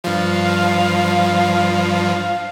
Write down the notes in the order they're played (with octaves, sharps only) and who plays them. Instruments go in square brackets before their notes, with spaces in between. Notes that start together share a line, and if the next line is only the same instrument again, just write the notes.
[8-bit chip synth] G2 F3 [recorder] F5